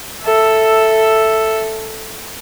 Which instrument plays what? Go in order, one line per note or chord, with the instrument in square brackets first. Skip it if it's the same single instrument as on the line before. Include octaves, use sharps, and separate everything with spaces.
[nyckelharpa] A4 E5